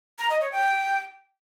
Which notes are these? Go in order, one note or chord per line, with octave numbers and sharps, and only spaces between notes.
A#5
D#5
C#5
G5